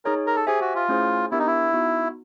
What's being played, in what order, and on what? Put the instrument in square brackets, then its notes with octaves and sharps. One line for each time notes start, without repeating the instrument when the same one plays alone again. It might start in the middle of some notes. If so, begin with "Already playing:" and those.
[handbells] D#4 G#4 C#5 [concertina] A#4
[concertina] A#4
A4
[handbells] G4 C5 E5 G#5 [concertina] G#4
[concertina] F#4
F4
[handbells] A3 C#4 E4 G#4 C5
[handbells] B3 D4 G4 A#4 [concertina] E4
[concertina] D#4
E4
[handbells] B3 D#4 F#4